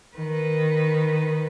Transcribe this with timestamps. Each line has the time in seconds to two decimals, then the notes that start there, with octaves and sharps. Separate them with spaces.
0.16 D#3 B4